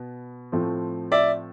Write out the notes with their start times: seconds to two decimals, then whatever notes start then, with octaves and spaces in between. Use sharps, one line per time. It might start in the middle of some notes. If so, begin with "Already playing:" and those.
Already playing: B2 B3
0.52 A2 F3 A3 C4
1.12 D5 E5